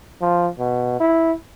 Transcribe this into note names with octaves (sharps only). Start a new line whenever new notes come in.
F3
B2
E4